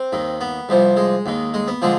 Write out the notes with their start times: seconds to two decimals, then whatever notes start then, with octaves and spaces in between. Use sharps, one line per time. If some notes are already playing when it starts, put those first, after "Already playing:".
Already playing: C4
0.13 D#2 D#3
0.41 B3
0.69 C2 C3 F3
0.97 G#3
1.26 D#2 D#3
1.54 G#3
1.68 B3
1.82 D3 F3 G#3